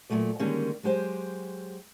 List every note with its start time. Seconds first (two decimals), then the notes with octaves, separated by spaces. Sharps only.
0.10 A#2 F3 F#3 A3 D5
0.39 D3 D#3 G3 G#3 A#3 C#4
0.83 F#3 G#3 G4 C5 G#5